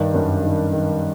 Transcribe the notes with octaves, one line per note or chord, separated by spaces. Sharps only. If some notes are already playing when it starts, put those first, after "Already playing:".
Already playing: G2 D#3
F#2
D#3
D#3